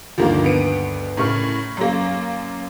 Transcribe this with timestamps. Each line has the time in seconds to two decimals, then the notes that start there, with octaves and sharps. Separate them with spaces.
0.18 D2 G2 D#3 F3 A#3 A#4
0.44 B3 D7 D#7
1.17 A2 C#3 A#4 C#6 F6
1.77 F#2 A#3